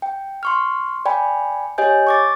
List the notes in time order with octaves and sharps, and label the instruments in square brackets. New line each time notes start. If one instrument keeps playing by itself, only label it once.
[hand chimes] G5
C6 C#6 F6
D5 G5 G#5 B5
G4 C#5 D#5 G#5 G6
C#6 D6 A6